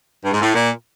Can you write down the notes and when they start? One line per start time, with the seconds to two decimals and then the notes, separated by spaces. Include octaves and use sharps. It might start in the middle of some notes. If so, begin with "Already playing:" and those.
0.24 G2
0.33 G#2
0.42 A2
0.55 A#2